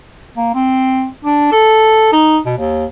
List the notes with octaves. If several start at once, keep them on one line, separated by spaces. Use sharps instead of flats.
A#3
C4
D4
A4
D#4
B2
D#2